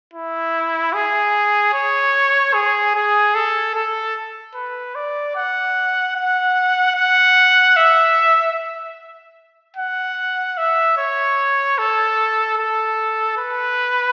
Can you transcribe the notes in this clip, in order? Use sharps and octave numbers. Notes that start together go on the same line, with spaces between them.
E4
G#4
C#5
G#4
G#4
A4
A4
B4
D5
F#5
F#5
F#5
E5
F#5
E5
C#5
A4
A4
B4